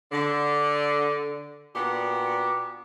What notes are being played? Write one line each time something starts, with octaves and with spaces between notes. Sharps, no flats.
D3
A#2 B3 D4 F#4 G4